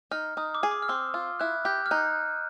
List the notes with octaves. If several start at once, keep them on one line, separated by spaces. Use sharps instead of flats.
D#4 F6
D#4 D#6
D6
G#4
D6
F6
C4 E6
F4
E4 F#6
G4 G6
F6
D#4 F#6